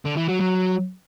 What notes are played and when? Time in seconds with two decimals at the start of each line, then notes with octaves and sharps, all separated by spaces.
0.05 D3
0.17 E3
0.29 F#3
0.41 F#3